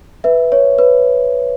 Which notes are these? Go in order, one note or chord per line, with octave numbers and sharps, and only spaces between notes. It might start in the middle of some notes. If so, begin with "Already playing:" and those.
B4 E5
C#5
B4